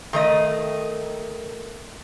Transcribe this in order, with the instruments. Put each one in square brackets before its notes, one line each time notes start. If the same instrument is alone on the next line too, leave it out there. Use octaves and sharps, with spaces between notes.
[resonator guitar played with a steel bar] D#3 A3 D#5